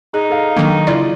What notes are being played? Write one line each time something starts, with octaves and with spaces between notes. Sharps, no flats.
D#4 G#4
A4 F5
D#3 F#3 A#3 D4 A#5
C#3 E4 F4 D5